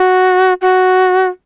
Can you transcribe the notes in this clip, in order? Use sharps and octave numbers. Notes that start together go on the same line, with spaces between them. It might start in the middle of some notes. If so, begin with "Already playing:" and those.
Already playing: F#4
F#4